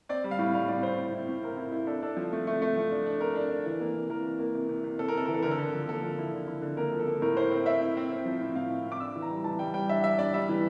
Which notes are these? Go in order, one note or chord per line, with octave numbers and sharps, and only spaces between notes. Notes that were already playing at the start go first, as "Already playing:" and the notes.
C4 D5
G3
F5
A2
G3 F5
A2 D5
C4 C5
A2
E4
A2
C4 A#4
E4
E4
D4 A4
D4 A4
F3
A3
A3
A3
F3
D4
D4
D4 A#4
D4
D4
E3
A#3
C3
E3 A#4
C3
A#3
C3
C3
C3
C3 A4
A#4
C3 A4
E3 A#4
A4
D3 A#4
A4
D3
F3
A#3 A4
F3
E4
D3
E4
D3
A#3 A#4
F3
A4
A#3
A2 A#4
E4 C5
C4
C4 E5
E4
C4
C4
F3
A2
A2 F5
A2
A2
D6
D4 E6
E3
A#5
G3
E3 A5
G3 G5
G3 G5
D4 E5
G3 E5
D4 D5
G3 E5
E3